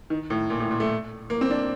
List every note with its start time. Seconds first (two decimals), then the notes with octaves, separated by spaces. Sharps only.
0.10 D#3
0.30 A2
0.50 A#2
0.60 A2
0.71 A#2
0.80 A3
1.30 A#3
1.41 C4
1.50 D4